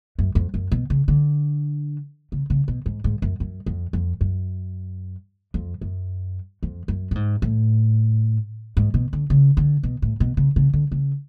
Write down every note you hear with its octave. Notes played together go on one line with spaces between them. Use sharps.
F#2
F2
F#2
B2
C#3
D3
C#3
C#3
B2
G#2
G#2
F#2
F#2
F2
F2
F#2
F2
F#2
F2
F#2
A2
G#2
A2
G#2
B2
D3
C#3
D3
B2
A2
B2
C#3
C#3
D3
C#3